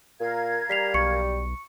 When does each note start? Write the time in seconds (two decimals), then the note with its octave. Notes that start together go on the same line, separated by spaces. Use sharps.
0.20 A#2 A#4 F5 G#6
0.70 G3 B6 C7 F7
0.94 B1 C#6 C#7